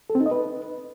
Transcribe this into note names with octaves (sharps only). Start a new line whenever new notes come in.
A4
C4
D#4
D#5
B4